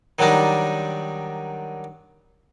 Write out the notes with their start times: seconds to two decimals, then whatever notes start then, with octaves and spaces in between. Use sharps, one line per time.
0.19 D#3 F#3 G3 D4 D#4